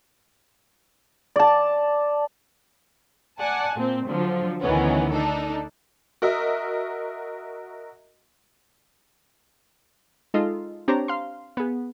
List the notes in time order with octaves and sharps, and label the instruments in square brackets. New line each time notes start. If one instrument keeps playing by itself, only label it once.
[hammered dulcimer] D5 A5
[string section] D5 F#5 G#5 A5
A#2 C4
D3 F3 F#3
D2 D#3 E3 B3 C#4
D4 D#4 A4
[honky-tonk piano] F#4 A#4 D#5 E5
[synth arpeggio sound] G#3 D#4 F4 A4 D#5
C4 D4 G4 C5 C#5 A#5
F5 C6
B3 G#4